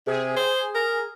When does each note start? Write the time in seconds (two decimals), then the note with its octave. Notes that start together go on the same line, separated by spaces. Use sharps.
0.07 C3 G#4
0.36 C5
0.75 A#4